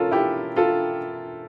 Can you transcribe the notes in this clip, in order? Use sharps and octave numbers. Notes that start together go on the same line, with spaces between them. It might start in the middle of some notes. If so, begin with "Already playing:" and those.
Already playing: E1 C#4 F4 A4 A#4
E4 G4
F4 A4